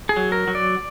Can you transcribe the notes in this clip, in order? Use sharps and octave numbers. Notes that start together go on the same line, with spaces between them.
G#4
F#3
A#4
F#3
D5